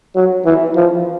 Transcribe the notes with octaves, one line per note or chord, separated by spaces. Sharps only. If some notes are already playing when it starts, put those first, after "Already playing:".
F#3
E3
F3